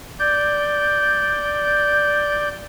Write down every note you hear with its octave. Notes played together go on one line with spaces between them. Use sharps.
D5 G6